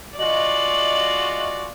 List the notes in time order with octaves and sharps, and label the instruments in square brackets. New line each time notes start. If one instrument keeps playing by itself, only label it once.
[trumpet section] G#3 F4 F#4 [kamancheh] D5 [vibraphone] D#5 [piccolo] F#7